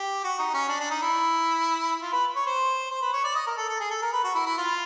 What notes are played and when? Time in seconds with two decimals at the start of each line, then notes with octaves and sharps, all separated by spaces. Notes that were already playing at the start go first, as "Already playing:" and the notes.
Already playing: G4
0.24 F#4
0.39 D#4
0.54 C#4
0.69 D4
0.80 D4
0.91 D#4
1.02 E4
2.02 F4
2.13 B4
2.36 C#5
2.46 C5
2.91 C5
3.01 B4
3.13 C#5
3.24 D5
3.35 D#5
3.47 A#4
3.57 A4
3.69 A4
3.80 G#4
3.91 A4
4.02 A#4
4.13 B4
4.24 F#4
4.35 E4
4.46 E4
4.58 F4